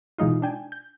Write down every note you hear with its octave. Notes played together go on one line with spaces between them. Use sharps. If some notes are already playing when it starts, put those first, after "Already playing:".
B2 E3 G#3 D#4 F4
D4 G5 G#5
G6